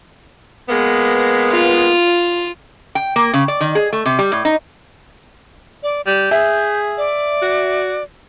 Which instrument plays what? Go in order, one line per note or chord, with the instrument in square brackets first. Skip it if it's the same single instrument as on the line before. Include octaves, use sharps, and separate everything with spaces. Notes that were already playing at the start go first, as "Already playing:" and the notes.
[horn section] G#3 A#3 B3
[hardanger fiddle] F4
[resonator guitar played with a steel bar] G5
A#3
C#3
D5
D#3
G#4
A3
C3
G3
A2
D#4
[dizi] D5
[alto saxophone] G3 [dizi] G6
[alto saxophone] G#4 [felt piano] E5
[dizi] D5
[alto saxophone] F#4